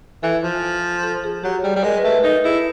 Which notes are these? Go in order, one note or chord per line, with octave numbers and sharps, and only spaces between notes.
E3 A4
F3
A4
G#4
F#3 G4
G3 G#4
G3
G#3 A#4
B4
A3
B4
D#4 A4
E4 G#4